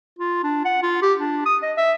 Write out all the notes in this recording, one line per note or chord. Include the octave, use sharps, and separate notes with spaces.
F4
D4
F#5
F4
G4
D4
D#6
D#5
E5